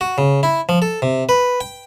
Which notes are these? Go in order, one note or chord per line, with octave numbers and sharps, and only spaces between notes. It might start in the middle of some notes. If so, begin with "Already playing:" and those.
F#4
C#3
E4
F3
A4
C3
B4
G5